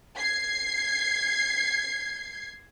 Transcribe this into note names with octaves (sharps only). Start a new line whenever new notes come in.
G#6 C7